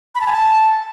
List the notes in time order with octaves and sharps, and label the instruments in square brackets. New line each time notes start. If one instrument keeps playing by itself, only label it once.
[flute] B5
A5
G#5
A5